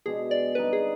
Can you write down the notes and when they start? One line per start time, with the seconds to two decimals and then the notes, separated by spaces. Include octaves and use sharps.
0.06 B2 G#3 D4 G4 G#4
0.31 D5
0.55 D3 G3 C4 D#4 B4
0.73 G#4